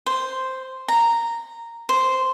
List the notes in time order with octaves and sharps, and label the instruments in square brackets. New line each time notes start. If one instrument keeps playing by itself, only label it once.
[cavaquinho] C5
A#5
C5